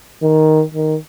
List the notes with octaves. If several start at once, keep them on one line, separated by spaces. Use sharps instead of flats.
D#3
D#3